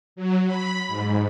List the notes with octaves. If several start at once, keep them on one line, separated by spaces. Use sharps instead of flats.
F#3
B5
G#2